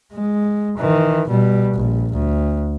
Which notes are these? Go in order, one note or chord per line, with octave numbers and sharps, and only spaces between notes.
G#3
D#3 E3
B2 G3
A#1
D2